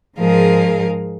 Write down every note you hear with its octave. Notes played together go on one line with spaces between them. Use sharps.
G#2 F3 G#3 G#4 A#4 F5